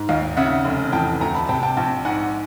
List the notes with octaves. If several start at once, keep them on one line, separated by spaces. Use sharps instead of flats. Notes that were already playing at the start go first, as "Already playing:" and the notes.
Already playing: G#2
D#2 D#5 F5
C#3 E5 F#5
F1
E2 G5 A5
D2 G#5 A#5
A5 B5
C3 G5 A5
G5 A5
A#1 G5 A5
G#2 F#5 G#5